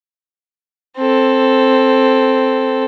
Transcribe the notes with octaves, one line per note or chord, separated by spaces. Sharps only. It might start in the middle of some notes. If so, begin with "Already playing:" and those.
C4 A4